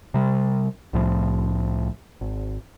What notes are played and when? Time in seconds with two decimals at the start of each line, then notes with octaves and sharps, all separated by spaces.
0.14 C3 G3
0.93 C2 A2 F3
2.21 G#1